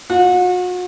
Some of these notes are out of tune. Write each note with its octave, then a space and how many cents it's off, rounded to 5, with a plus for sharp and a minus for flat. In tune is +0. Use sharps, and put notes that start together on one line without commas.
F#4 -40